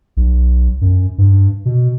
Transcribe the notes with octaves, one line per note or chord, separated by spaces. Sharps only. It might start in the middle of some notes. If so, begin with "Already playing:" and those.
B1
F#2
G2
B2